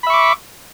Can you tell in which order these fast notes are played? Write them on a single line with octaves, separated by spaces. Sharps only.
B5 E5 C#6 D6